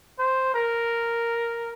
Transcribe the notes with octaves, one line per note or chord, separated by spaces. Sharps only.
C5
A#4